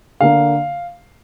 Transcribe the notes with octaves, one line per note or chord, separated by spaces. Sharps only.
D3 A#3 F5